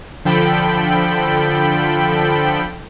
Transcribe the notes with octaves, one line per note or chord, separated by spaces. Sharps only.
D3 F3 A4 G5 B5